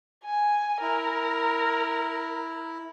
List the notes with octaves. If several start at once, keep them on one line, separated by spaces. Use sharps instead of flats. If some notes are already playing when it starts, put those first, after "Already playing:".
G#5
E4 A#4